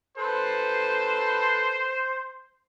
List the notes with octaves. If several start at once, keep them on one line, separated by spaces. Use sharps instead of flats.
A4 B4 C5